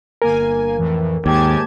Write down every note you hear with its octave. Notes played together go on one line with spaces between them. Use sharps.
G1 A#3 A#4 G#5
F2 A2 E3
D#2 G#2 G4 G#5 A5 G#6